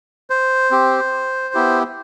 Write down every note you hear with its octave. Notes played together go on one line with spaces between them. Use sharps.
C5
C4 G4
B3 E4 G4